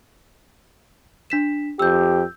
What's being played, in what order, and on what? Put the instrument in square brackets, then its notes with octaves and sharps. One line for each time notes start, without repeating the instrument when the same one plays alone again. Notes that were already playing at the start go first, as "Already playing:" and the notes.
[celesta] D4 B6 E7
[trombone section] F2 G4 [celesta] E6 G6